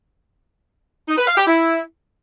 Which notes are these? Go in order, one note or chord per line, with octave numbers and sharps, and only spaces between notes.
D#4
B4
F5
G4
E4